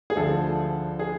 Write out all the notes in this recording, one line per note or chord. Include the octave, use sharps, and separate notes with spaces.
G#4
D2 D3 F3 A4
G#4